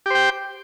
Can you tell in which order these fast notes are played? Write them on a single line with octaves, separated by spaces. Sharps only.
G4 C5 G5